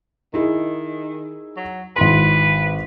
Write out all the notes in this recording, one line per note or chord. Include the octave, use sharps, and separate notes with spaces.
D#3 D#4 E4 G#4
F#3
G#1 E4 B4 C6